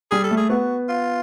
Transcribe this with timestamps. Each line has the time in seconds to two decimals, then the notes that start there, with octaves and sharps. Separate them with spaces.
0.11 G3 G#4
0.24 A4
0.31 A3
0.37 G#4
0.50 B3 F#4
0.89 F4